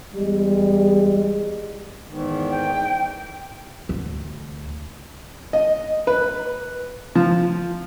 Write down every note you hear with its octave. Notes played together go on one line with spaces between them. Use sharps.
E2 G3 G#3
E2 G#2 D#3
G5
D2
D#5
B4
F3